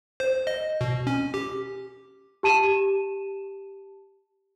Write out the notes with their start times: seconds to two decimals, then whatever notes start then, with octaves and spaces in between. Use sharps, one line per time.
0.20 C5
0.47 D#5
0.81 B2
1.07 C#4
1.34 G4
2.43 G4 A5 D#7 E7